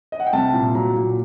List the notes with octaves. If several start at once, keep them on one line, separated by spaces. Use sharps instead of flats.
D#5
F#5
G5
C2 A5
A#2
F#3 A#5
A#2